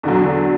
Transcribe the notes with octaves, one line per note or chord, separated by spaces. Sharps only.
E2 D3 F#3